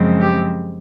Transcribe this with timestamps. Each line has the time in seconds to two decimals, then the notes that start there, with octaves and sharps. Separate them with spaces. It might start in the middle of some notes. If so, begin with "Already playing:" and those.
Already playing: F#2 C#3 F3 G#3 C4
0.21 G4